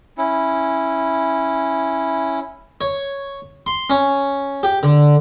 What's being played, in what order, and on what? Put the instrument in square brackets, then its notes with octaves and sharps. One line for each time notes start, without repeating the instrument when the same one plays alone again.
[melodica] C#4 E4
[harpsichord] C#5
C6
C#4
G4
D3